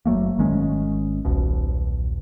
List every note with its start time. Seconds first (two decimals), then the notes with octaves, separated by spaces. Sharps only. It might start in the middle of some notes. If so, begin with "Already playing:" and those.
0.06 F#1 F#3 A3 A#3
0.38 G#1 D#3 G#3 C#4
1.25 D#1 B1 B2